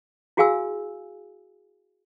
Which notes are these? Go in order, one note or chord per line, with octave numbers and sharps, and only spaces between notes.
E4 F#4 G#4 F5 G#5 E6